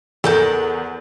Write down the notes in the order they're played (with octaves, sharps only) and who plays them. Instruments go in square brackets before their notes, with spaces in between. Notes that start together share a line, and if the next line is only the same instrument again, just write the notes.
[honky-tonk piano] E2 G6 [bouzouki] A4 A#4 F#5